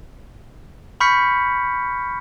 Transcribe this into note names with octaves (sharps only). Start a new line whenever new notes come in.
B5 C#6 F6 G6 B6 C#7